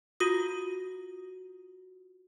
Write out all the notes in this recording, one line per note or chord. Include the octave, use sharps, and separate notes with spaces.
F4 F#4 D#6